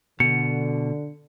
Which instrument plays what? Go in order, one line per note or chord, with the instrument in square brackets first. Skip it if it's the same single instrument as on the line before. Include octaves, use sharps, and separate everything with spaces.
[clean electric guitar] B2 [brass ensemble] D3 [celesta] C#7